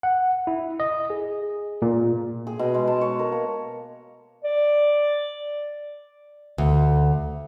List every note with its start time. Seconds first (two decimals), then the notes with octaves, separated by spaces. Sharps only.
0.03 F#5
0.47 E4
0.80 D#5
1.10 G#4
1.82 A#2
2.47 G#4
2.59 B2
2.74 G#3
2.88 A5
3.01 C#5
3.19 A#4
3.32 A#3
4.44 D5
6.58 D2